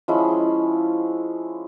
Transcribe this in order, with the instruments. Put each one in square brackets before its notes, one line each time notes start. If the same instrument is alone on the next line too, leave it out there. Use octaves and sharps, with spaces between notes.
[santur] F3 G#3 C#4 E4